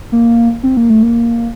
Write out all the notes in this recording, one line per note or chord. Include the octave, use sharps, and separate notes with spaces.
A#3
C4
A#3
A3
A#3